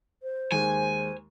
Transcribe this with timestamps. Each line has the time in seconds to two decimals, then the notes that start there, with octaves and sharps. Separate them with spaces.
0.23 C5
0.52 D#2 G#3 G#5